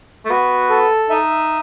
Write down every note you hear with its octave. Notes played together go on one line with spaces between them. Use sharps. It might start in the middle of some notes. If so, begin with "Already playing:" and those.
A3
B3 F#4
A4
D#4 E5